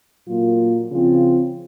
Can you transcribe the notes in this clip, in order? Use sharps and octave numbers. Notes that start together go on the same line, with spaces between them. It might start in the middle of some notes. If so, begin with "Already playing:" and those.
A#2 F#3 A#3 F4
C#3 F3 C4 F4